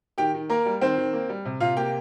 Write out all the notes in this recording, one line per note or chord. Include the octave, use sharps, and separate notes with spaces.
D#3 G4 G5
D#3
A#3 A#4
G3
D#3 C4 C5
D#3
A#3
G3
C3
C3 F4 F5
A#3 G4 G5